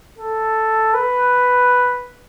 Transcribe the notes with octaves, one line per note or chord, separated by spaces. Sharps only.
A4
B4